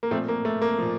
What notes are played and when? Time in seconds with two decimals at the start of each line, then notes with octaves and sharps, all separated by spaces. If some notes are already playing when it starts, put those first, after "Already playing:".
0.03 A#3
0.11 A#2 F3 A3 C4
0.28 A#3
0.45 A3
0.62 A#3
0.79 A#2 F3